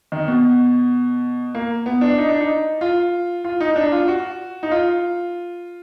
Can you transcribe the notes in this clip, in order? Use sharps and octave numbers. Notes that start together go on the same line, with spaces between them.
D#3
B2
A#3
B3
D4
D#4
D4
D#4
F4
F4
D#4
D#4
D4
F4
F#4
D#4
F4